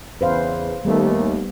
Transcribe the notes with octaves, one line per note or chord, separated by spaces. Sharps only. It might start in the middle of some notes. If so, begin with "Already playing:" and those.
E2 C#3 B4 C5 F5
D#2 G3 A3 B3